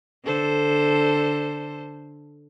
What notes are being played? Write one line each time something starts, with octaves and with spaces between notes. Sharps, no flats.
D3 A4 C5